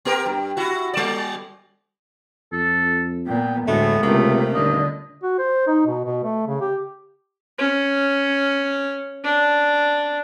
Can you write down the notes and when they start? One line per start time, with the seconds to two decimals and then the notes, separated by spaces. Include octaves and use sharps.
0.05 B3 G4 A#4
0.26 G2
0.57 E4 F#4
0.94 G3 D5
2.52 F2 A4
3.27 A#2 B3 G5
3.68 D2 A2 G#3 A3 B3
4.03 C#2 C3 A3 A#3
4.54 D#1 D3 D#5
5.23 F#4
5.38 C5
5.67 D#4
5.86 B2
6.05 B2
6.24 A3
6.47 C#3
6.61 G4
7.58 C#4
9.24 D4